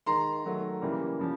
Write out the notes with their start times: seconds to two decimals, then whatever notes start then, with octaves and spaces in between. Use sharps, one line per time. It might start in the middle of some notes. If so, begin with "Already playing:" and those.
0.06 D#3 G#3 A#5 C6
0.45 D#3 F#3 A3
0.81 C#3 E3 G3 A#3
1.19 C#3 F3